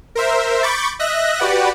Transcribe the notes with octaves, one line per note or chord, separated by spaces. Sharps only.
A#4 C5 E5
B5 C#6 D6 G6 A6
D#5 E5 F#6 A#6
F#4 G4 B4 D5 F#5